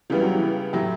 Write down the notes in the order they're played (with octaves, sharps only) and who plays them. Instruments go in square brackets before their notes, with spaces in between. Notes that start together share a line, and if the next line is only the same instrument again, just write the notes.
[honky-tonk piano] C#2 C#3 G3 B3 [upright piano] E3
[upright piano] F#3
E3
[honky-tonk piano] A2 F#3 A3 E4 G4 [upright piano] E3